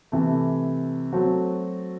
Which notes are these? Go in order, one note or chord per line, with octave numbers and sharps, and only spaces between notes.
C3 E3 A3
F#3 A3 C4 F#4